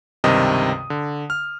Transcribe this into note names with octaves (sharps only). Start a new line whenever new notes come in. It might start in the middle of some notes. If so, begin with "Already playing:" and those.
C#2 G2 C3 D#3 D#5 D#6
D3
F6